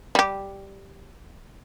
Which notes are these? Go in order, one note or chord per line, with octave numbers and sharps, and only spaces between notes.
G3 G4